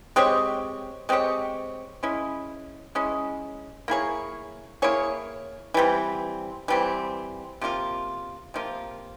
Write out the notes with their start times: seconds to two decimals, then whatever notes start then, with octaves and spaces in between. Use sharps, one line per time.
0.16 G#3 C4 G4 C#5
1.09 G#3 C4 G4 C#5
2.03 G#3 C#4 E4
2.95 G#3 C#4 E4
3.88 A#3 E4 G#4 C#5
4.82 A#3 E4 G#4 C#5
5.74 E3 G3 C4
6.68 E3 G3 C4
7.61 C3 F3 A#3 F4
8.54 C3 F3 A#3 F4